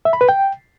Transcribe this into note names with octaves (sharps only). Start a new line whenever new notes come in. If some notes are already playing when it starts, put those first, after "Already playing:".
E5
B5
B4
G5